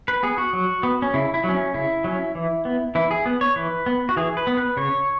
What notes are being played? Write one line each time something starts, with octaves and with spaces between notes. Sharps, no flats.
B4
B3 G#4
F#4
F#3
B3
C#4
C#3 E4
E4
F#3 C#4
C#4
C#3 E4
F#3 C#4
E3
B3
E3 E4
G#4
B3
C#5
E3 B4
B3
F#4
E3 G#4
B4
B3
B4
C#3 C#5